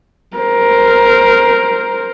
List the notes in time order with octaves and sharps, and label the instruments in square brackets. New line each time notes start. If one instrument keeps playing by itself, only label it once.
[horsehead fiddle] A#4 C5